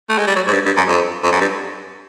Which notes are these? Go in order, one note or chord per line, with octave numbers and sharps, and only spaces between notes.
A3
G#3
G3
F#3
G#2
G2
G2
F#2
F2
F2
F#2
G2